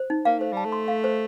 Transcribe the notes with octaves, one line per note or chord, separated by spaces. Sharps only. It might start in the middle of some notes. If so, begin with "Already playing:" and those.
Already playing: C5
D#4
A#3 F5
A3 C5
G3 A5
A3
C6
F5
C5